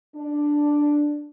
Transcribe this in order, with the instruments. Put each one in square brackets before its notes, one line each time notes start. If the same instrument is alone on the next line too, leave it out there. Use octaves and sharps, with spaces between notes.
[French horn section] D4